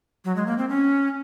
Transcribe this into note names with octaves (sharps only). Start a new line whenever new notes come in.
F#3
G#3
A#3
C4
C#4